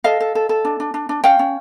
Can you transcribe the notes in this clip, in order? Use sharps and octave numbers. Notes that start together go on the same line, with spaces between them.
A4 D#5 F5
A4
A4
A4
D4
D4
D4
D4
C#4 F5 G5
C#4